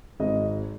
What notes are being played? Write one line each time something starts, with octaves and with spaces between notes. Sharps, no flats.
G#1 D#5